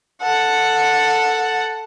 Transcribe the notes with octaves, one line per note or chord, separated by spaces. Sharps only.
A4 F#5